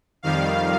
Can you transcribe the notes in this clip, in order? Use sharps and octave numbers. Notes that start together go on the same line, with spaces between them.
F2 D#3 G3 F5